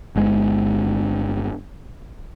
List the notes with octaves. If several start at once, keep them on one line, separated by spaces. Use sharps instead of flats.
G1 G#3